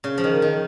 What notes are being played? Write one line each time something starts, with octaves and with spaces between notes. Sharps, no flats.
C#3
F3
D#3
D#3